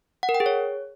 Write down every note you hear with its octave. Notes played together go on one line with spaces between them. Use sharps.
F#5
A#4
G5
G#4
C#5